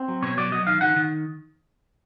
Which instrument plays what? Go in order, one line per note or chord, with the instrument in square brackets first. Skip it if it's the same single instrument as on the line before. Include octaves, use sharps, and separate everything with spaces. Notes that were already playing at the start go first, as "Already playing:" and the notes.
Already playing: [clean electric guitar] C4
F#3
B2 C#5
F#3 D5
F#3 D#5
D#3 F5
D#3 F#5
D#3